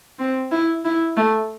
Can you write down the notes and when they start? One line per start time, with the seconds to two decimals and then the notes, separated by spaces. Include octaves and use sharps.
0.19 C4
0.52 E4
0.85 E4
1.17 A3